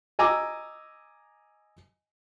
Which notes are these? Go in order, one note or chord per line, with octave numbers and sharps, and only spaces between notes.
D#5 G#5 A#5 D6 E6